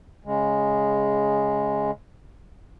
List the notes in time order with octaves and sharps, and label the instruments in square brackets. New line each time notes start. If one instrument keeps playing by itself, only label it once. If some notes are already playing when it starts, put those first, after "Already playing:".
[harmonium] C#3 G#3